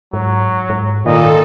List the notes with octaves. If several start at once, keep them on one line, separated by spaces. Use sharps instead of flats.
G#2 F#3
G#2
A#2 D#3 A4 D#5